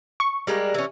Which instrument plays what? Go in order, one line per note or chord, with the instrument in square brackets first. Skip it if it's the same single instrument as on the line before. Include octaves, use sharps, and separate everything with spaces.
[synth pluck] C#6
[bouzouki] G3 G#3 A#3
E3 C#4